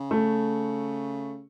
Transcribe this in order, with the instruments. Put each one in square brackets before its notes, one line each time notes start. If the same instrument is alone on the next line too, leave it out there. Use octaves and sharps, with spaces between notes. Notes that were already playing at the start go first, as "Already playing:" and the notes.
Already playing: [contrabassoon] C#3
[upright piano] A3